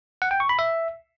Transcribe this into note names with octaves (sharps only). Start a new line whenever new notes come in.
F#5
G5
C#6
B5
E5